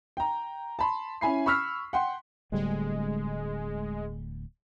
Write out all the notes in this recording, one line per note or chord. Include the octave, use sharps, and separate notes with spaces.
G5 A#5
A5 B5 C6
C#4 E4 G#5 B5 C7
B5 C#6 E6 F6 B6
F#5 G5 C6
D1 D2 G3 G#3